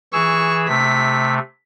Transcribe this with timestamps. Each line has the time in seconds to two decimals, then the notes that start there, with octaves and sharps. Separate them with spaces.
0.13 E3 G#4 C#6 E6
0.68 C3 A3 B6